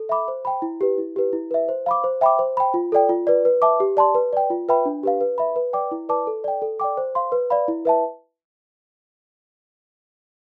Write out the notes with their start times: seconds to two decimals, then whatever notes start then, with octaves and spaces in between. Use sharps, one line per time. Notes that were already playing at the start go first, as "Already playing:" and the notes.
Already playing: A4
0.09 E5 B5 D6
0.28 C5
0.45 G5 B5
0.62 E4
0.81 G4 B4
0.98 E4
1.16 G4 B4
1.33 E4
1.51 B4 E5
1.69 C5
1.86 F5 B5 D6
2.04 C5
2.21 E5 G5 B5 D6
2.39 C5
2.57 G5 B5
2.74 F4
2.92 A4 D5 G5
3.09 F4
3.27 B4 D5
3.45 B4
3.62 E5 A5 D6
3.80 G4
3.97 D5 A5 C6
4.14 B4
4.33 D5 G5
4.50 F4
4.69 B4 E5 G5 B5
4.85 D4
5.03 G4 B4 F5
5.21 B4
5.38 E5 B5
5.56 B4
5.73 D5 G5 D6
5.91 E4
6.09 B4 D5 A5 D6
6.27 A4
6.44 D5 G5
6.62 A4
6.80 D5 G5 D6
6.97 C5
7.15 F5 C6
7.32 B4
7.50 D5 F5 B5
7.68 E4
7.85 B4 E5 A5